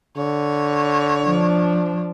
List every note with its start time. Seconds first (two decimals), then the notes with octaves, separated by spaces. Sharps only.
0.17 D3 C#5
1.23 F3 D4